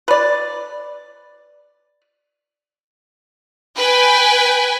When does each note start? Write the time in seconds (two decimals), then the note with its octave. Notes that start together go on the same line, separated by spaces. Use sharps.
0.08 B4 D5
3.77 B4 G5 G#5